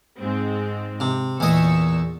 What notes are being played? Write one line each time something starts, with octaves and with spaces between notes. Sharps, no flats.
G#2 G#3 C4
C3
E2 A#2 D#5 C#6 E6